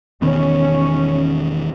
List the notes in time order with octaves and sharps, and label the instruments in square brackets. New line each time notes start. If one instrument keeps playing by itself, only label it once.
[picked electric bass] E1 D#3 B3 [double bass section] C#4